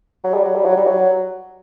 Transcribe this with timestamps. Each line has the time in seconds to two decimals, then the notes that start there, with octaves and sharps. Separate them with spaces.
0.24 F#3
0.34 G3
0.44 F#3
0.55 G3
0.65 F#3
0.77 G3
0.87 F#3